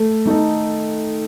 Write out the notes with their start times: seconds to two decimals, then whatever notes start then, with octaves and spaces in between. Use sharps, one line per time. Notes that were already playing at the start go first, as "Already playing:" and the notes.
Already playing: A3 A4
0.26 D#3 A3 D#4 A4